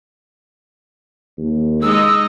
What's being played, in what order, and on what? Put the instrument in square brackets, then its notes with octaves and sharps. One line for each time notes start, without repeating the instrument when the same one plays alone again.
[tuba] D#2
[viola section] G#3 D#4 D#5 [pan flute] E6